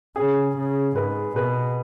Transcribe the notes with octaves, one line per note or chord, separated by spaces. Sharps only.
C#3 G#4
C#3
G#2 B4
B2 B4